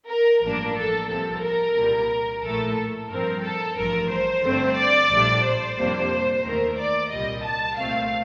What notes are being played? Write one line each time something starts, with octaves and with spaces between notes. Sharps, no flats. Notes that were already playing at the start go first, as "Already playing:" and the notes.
A#4
A1 G2 F3 A#3 D4 A#4
A4
C2 C3 F3 C4 A4
A#4
C2 A#2 G3
A#1 A2 A3 A4
G2 F3 C4 A#4
A4
A1 G2 F3 A#4
C5
G2 D3 A3 C4
D5
A#1 A2 G3 D4
C5
F2 C3 G3 A#3 D4
D#2 D#3 A3 A#4
D5
C2 A#2 G3 D#5
A5
C2 A#2 A3 C4 F5